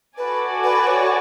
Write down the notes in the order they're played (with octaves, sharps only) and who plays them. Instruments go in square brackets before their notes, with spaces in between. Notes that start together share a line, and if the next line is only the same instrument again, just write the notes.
[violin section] F#4 A4 D5 G#5 [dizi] B4
[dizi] B4
C#5